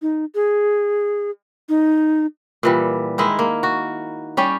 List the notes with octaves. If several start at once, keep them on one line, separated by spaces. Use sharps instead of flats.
D#4
G#4
D#4
A#2 E3 G3
D#3 G#3 E4
A#3
F#4
G3 C#4 G4